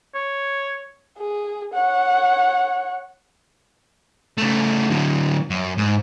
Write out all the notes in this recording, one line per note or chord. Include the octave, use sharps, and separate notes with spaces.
C#5
G#4
C#5 F#5
C#3 A3
D3 F#3
F#2
G#2